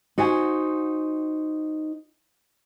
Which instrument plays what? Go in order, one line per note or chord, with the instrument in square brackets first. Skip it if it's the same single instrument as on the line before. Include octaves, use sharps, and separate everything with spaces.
[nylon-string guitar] D#4 F#4 C5 G#5